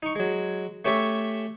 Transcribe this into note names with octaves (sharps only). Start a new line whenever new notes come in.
D#4 C#6
F#3 G#3
A3 C#4 G4 C#5 E5